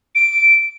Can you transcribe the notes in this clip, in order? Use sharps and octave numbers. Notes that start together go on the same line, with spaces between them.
D7